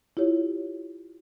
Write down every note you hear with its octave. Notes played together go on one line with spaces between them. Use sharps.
E4 F4 G4 C#5